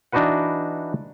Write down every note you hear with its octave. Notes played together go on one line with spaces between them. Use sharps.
E3 D4 D#4 F#4 B4 F#5